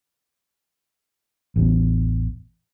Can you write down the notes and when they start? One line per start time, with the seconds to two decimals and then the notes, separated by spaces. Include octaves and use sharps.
1.56 A1 E2